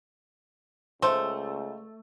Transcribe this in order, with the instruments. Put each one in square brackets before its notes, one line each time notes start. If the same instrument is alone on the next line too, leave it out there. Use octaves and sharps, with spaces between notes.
[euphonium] C#2 [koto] A3 [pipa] C5